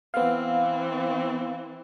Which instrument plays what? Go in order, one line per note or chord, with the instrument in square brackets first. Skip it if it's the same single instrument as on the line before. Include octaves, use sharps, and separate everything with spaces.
[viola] E3 C4 [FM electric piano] B3 F5